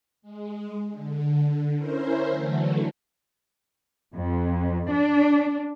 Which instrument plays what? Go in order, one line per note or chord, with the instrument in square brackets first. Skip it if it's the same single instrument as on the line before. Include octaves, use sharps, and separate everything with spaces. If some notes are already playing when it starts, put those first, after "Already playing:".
[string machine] G#3
D3
C#4 E4 A#4 C5
D3 E3 F#3 A3
[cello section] F2
D4